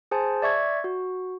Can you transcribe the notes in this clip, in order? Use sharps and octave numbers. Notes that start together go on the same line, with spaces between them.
G#4 C5 G#5 A5
D5 E5 C#6 G#6
F#4